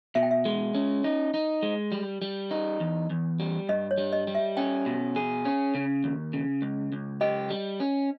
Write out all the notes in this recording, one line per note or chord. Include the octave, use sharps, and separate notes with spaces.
B2 E5
G5
E5
G#3
C#4
D#4
D#4
G#3
G3
G3
D#4
E2
E2
G3
G2 D#5
C#5
G3
D#5
G3
E5
C#4 G5
B2
G#4
C#4
C#3
D#2
C#3
C#2
C#2
G4 D#5
G3
C#4